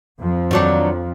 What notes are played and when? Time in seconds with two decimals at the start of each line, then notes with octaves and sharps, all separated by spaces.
0.20 F2 F3
0.51 D#3 F#3 D4